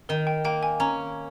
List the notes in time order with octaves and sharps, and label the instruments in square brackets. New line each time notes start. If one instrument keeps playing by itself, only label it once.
[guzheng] D#3 [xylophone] A#4
[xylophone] G5
[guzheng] A#3 [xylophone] G5
[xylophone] G#5
[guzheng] C#4 [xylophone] A#5